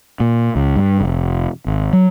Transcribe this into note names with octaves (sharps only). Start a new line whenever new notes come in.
A#2
C#2
G2
F1
G#1
F#3